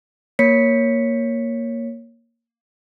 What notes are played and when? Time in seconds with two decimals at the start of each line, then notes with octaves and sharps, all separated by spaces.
0.39 A#3 C#5 B6 C#7